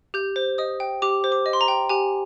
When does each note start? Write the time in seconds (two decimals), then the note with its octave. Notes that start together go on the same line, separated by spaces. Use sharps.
0.14 G4 G6
0.36 C5
0.58 D#5 D#6
0.80 G5
1.02 G4 D6
1.24 C5
1.32 D6
1.46 D#5
1.53 C6
1.61 A#5
1.68 G5
1.89 G4 G#5